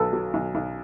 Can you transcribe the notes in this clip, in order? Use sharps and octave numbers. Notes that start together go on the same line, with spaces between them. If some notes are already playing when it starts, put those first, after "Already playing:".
Already playing: B1 F#3 A4 B4
F#3
B1
B1